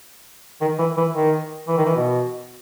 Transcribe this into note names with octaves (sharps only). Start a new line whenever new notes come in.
D#3
E3
E3
D#3
E3
D#3
E3
B2